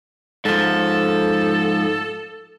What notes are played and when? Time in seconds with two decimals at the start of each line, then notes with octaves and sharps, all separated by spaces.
0.45 G#2 F3 A4